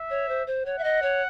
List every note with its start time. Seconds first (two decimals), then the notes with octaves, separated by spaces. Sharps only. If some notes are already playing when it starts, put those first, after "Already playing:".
Already playing: E5
0.10 C#5
0.29 C5
0.47 C5
0.66 C#5 F#5
0.78 E5
0.84 D#5
1.02 C#5